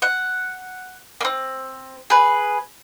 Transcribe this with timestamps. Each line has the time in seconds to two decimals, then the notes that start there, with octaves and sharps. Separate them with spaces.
0.02 F#5
1.21 A#3 C4
2.10 G#4 B4